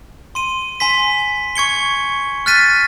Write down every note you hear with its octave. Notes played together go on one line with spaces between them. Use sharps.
C6 D#7
G#5 C6 B6
C#6 G#6 C#7 G7
F6 F#6 A6 B6 D#7